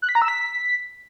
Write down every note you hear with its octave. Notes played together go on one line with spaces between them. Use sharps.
F#6
B6
A#5
E6
B6